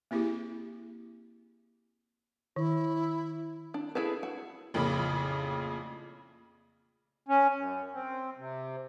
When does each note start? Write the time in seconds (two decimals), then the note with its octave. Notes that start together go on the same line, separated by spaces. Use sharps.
0.11 A#3 C4 E4 G4 G#4
2.56 D#3 E4
3.74 D4
3.95 E4 G#4 A4 B4
4.23 F#4
4.74 A1 F2 A#2 C#3 B5
7.28 C#4
7.55 F#2
7.94 C4
8.38 C3